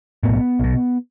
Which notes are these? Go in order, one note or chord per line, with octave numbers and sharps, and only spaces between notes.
B1 A2 B3
B1 B2